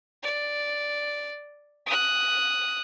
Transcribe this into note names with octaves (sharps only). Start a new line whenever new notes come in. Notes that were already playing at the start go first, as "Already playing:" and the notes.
D5
D#6 F#6